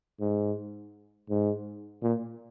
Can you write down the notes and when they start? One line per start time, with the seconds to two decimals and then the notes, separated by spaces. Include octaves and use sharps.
0.20 G#2
1.29 G#2
2.02 A#2